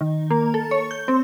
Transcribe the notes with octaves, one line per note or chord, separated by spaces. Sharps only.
D#3
A#3
A4
C#5
G6
C4